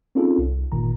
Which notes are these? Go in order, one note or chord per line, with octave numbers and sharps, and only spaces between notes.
C4 C#4 D#4 F4 G#4 A4
C2
G1 A#2 D#3 A#5